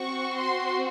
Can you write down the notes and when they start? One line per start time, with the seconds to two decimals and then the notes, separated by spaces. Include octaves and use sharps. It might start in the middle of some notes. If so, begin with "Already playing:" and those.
Already playing: C4 F#4 C#6
0.36 C6